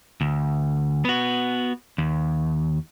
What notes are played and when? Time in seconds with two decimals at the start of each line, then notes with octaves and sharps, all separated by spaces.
0.21 D2
1.05 B3 F#4
1.98 D#2